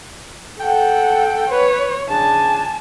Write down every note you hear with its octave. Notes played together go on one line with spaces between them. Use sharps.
A4 F#5 G5
B4 C#5
C#3 D4 G#5 A5